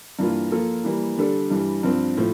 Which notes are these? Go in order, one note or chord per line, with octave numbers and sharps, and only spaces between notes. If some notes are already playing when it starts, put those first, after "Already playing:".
G2 E3 A#3 F4
F3 A#3 F4 A4
E3 G3 A#3
D3 G3 D4 A4
G2 E3 G3
G2 F3 C4
A2 F3